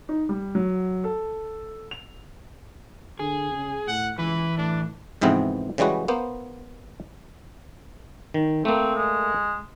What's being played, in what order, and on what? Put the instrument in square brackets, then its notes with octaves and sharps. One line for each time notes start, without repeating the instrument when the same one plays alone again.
[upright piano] D#4
G3
F#3
A4
F7
[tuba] D3 [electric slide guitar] G#4
[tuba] C#3
[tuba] A2 [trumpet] F#5
[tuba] C#2 [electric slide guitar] E3 [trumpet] B4
[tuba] A2 [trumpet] D4
[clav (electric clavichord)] F2 G#2 C3 E3 B3 C4
C#3 E3 G3 G#3 F#4 B4
A#3 B3 C5
D#3
[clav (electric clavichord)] A3 A#3 [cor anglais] C4
[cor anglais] G#3